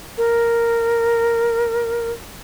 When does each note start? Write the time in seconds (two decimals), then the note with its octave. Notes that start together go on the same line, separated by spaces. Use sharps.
0.18 A#4